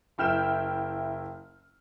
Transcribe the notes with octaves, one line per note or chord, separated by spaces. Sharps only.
F#1 E4 G5 F6 G6 E7